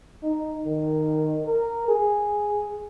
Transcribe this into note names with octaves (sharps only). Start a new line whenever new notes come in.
D#4
D#3
A#4
G#4